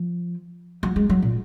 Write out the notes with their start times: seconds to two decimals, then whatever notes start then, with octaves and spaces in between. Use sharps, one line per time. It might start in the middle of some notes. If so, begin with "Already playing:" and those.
Already playing: F3
0.83 F#3
0.96 G#3
1.09 F#3
1.22 A#2